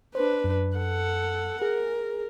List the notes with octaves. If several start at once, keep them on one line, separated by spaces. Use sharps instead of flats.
D4 B4 C5
F#2
A4 F#5
G#4 A#4